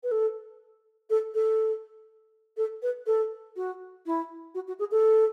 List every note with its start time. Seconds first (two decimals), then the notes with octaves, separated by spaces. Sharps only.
0.03 B4
0.11 A4
1.10 A4
1.34 A4
2.57 A4
2.82 B4
3.06 A4
3.56 F#4
4.06 E4
4.55 F#4
4.68 F#4
4.79 G#4
4.91 A4